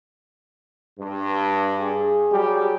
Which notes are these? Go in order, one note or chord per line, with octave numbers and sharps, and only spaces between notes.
G2
G#4
F#3 G3 G4